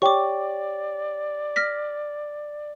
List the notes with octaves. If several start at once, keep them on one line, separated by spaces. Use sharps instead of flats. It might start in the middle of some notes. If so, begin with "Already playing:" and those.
G4 C#5 D5 G5 C#6 D6
F6 A#6 B6